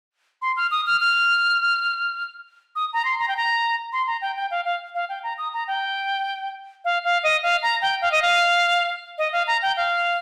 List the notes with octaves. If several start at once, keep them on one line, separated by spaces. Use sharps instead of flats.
C6
F6
D#6
F6
F6
D#6
A#5
C6
A#5
G5
A#5
C6
A#5
G5
G5
F5
F5
F5
G5
A#5
D#6
A#5
G5
F5
F5
D#5
F5
A#5
G5
F5
D#5
F5
D#5
F5
A#5
G5
F5